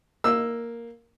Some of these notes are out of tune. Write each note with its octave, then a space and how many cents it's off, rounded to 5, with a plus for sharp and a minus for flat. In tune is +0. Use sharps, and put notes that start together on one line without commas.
A#3 +0 E6 +0